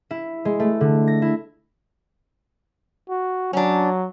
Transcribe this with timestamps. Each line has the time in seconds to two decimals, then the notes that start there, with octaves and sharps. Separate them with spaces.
0.11 E4
0.45 G#3
0.60 A3
0.81 D3
1.08 A#6
1.22 E4
3.09 F#4
3.53 F#3 C#4 D4